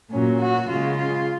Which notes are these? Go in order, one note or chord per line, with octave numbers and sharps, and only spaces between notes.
A#2 F#3 C#4
F#4
C#3 G#3 F4
F4